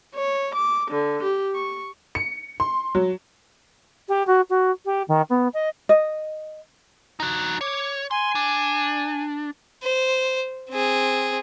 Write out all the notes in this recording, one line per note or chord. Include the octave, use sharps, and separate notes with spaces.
C#5
D6
D3
G4
C#6
C#7
C6
F#3
G4
F#4
F#4
G4
D#3
B3
D#5
D#5
D#4 F#4
C#5 D6
G#5 C6
D4
C5
C4 G#4